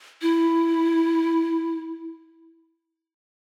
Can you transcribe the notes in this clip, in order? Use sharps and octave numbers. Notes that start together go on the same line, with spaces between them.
E4